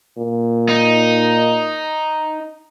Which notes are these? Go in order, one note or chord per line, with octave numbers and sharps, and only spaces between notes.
A#2
D#4